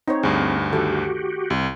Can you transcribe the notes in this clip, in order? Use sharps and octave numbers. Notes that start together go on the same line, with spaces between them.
C4 D#4 C5 C#5
D2 G2 G#4
D#3 A3 F#4 G4 A4
C2